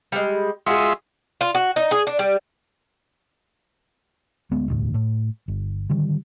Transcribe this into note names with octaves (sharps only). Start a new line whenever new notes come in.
G3 G#3
G#3 F4 F#4 G#4 E5
F4
F#4
D#4
G#4
D4
G3
D2 G#3 B3
E1 D2 A2
A2
G1
D3 D#3 G3